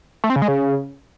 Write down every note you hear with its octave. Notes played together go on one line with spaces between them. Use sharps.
A3
C4
C#3
G#3
C#3